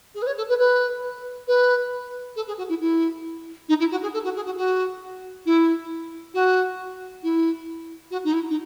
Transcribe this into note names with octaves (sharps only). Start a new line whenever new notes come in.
G#4
B4
C#5
A4
B4
B4
B4
A4
G#4
F#4
E4
E4
D#4
E4
F#4
G#4
A4
F#4
G#4
F#4
F#4
E4
F#4
E4
F#4
D#4
E4
D#4